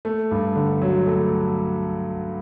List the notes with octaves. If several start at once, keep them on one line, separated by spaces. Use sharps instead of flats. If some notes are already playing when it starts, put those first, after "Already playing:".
A3
G2
D3
F#3
A3